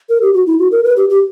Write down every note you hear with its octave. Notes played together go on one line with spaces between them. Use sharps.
A#4
G4
F#4
E4
F#4
A#4
B4
G4
G4